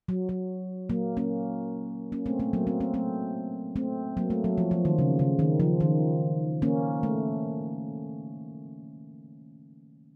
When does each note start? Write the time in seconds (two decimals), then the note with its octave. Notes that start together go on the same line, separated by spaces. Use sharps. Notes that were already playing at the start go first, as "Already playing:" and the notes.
0.08 F#3
0.29 F#3
0.89 F#3 A#3
1.17 A#3 C#4
2.12 A#3 C#4
2.26 A3 C4
2.40 A3 C4
2.53 F#3 A#3
2.67 A3 C4
2.81 A3 C4
2.94 A3 C4
3.76 A3 C4
4.17 F#3 A#3
4.30 A3
4.44 F#3
4.58 F3
4.71 F3
4.85 D#3
4.99 C#3
5.19 C#3
5.39 D#3
5.60 F3
5.81 D#3
6.62 A#3 C#4
7.03 A3